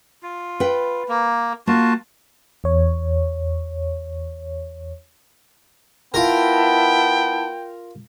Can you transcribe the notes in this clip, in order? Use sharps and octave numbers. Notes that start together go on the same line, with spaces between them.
F4
B4 G5
A#3
A#3 F4 F#4 A5
E2 C#5
B3 E4 F4 A#4 G5 A5